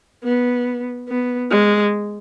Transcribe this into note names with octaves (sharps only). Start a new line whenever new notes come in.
B3
B3
G#3